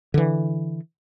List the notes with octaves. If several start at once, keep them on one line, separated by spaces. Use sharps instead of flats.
D3 E3